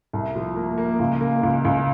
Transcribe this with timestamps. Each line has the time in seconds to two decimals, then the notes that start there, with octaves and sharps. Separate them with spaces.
0.13 C2
0.35 F3
0.56 A#3
0.78 A#3
1.00 C#2
1.21 A#3
1.43 C#2
1.65 C#2